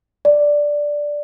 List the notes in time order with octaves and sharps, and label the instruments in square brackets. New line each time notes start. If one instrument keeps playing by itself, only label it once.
[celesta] D5